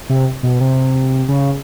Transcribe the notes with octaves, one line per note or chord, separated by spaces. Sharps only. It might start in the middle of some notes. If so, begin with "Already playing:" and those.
C3
B2
C3
C#3